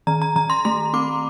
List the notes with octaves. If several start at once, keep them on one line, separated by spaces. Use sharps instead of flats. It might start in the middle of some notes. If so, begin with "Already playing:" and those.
D#3 A#5
A#5
D#3 A#5
C6
A3 C6
C4 D6